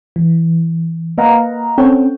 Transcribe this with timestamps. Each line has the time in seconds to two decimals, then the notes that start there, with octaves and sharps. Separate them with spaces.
0.16 E3
1.18 A#3 B4 D#5 F5 F#5 A#5
1.78 C4 C#4 A4 C#5 F#5 G5